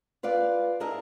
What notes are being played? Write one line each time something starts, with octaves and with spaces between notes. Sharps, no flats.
F4 B4 D5 F5
D4 E4 G#4 A#4 D#5 E5